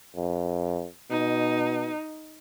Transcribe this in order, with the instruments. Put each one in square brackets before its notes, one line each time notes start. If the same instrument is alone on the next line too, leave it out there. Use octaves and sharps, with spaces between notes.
[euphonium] F2
[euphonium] B2 [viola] D#4